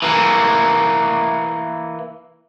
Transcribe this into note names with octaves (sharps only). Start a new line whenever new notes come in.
E3 A#3